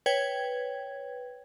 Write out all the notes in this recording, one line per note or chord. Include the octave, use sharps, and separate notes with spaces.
B4 C#5 G5 G#6